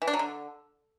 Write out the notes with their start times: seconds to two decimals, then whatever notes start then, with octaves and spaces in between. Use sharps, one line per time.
0.02 E3
0.07 D4
0.13 F#3
0.19 D3